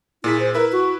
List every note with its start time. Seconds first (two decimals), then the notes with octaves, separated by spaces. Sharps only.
0.24 A#2 E4 G#4 B6
0.39 C5
0.55 E4 A#4 B4 E5
0.72 F#4